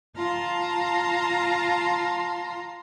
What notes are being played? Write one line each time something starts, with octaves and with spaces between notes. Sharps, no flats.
F4 F5 A5 A#5 C6